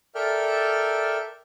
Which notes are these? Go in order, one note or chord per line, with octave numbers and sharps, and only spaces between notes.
A4 A#4 D5 E5 G5 F6